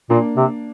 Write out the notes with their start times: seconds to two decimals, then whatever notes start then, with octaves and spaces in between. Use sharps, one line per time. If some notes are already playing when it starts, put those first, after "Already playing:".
0.10 A#2 A#3 D4
0.37 C3